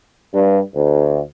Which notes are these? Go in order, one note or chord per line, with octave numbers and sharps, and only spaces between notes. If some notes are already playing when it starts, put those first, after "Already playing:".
G2
D2